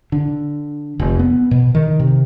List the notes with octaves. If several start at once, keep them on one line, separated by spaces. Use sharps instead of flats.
D3
F1
B3
B2
D#3
C3